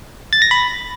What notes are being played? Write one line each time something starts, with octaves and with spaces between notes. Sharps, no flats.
A6
A#6
B5